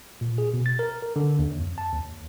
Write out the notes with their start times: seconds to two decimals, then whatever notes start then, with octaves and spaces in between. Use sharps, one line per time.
0.21 A#2
0.38 G#4
0.54 B2
0.66 A6
0.79 A#4
1.02 A#4
1.16 D3
1.39 D#2
1.60 F2
1.78 A5
1.93 D#2